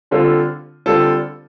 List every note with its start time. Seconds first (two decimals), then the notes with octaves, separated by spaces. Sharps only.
0.11 D3 G3 C4 F4 A4
0.86 D3 G3 C4 F4 A4